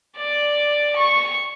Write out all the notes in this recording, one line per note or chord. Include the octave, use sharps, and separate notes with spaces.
D5
C#6